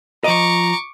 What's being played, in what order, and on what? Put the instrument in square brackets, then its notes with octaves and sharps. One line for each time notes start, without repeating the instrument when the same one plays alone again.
[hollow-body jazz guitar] F3 D#5 [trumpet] A#5 [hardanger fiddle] C#6 D6